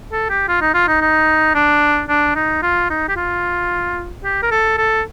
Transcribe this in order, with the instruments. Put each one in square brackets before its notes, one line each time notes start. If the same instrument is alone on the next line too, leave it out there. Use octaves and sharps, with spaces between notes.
[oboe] A4
G4
F4
D#4
F4
D#4
D#4
D4
D4
D#4
F4
D#4
G4
F4
G4
A#4
A4
A4